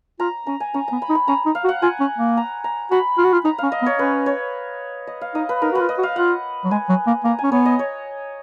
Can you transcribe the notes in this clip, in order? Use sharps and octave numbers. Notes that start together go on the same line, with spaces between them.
F4 A#5
C#4 A#5
G#5
C#4 A#5
B3 A#5
B5
D#4
B5
C#4 A#5
D#4
F5
F#4
F#5
F4 G#5
C#4
A#3
A#5
A#5
F#4 B5
F4
F#4
F4
D#4 A#5
C#4 F5
D#5
B3
C#5
C#4 B4
C#5
D#5
F5
D#4 D#5
B4
D#4 A#4
F#4 B4
F4
D#5
F#4
F5
F4 F#5
F#3
G#3 G#5
F#3
A#3
A#3 A#5
C#4 G#5
B3 C#5
D#5
C#5